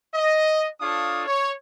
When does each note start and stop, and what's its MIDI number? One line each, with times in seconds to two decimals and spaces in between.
0.14 0.65 75
0.81 1.26 62
0.81 1.26 65
0.81 1.26 69
0.81 1.26 73
0.81 1.26 77
0.81 1.26 87
1.27 1.52 73